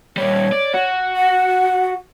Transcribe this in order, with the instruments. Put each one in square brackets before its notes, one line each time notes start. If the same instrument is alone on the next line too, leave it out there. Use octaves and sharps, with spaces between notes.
[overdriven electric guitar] A#2 G3 [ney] C#5
[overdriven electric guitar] D5
F#4
[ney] F#5